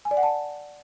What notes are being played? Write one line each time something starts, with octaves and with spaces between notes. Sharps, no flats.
G#5
D5
F#5
A5